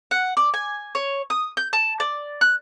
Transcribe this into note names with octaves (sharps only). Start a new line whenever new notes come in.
F#5
D5
G#5
C#5
D#6
G6
A5
D5
F#6